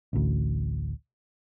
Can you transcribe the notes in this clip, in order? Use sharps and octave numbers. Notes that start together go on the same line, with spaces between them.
A1 D2